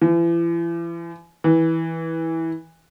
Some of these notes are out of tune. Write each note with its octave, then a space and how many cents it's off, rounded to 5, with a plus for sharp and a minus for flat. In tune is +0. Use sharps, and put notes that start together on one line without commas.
E3 +40
E3 -15